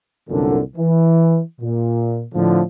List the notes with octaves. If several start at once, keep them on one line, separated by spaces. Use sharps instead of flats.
C2 F#2 A#2 D3
E3
A#2
A2 D3 F3